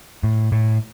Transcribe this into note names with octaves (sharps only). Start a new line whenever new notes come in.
A2
A2